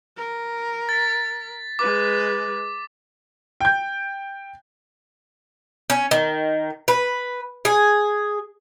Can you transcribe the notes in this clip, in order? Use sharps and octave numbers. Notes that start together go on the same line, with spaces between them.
A#4
A6 B6
G#3 B4 D6
G5 G6
C#4
D#3
B4
G#4